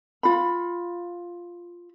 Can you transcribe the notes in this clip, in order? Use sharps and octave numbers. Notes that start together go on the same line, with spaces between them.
F4 B5